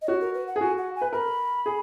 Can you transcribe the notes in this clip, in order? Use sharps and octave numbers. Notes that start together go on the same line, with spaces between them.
D#5
F#4 C#5
A#4
B4
F#5
G#4
F#4 G#5
F#5
G#5
B4
A#4 B5
G#4